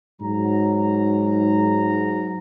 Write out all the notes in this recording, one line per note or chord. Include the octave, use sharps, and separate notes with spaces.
G#2 F#3 A#5